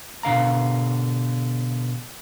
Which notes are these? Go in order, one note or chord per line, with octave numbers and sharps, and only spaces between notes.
B2 D3 F5 A#5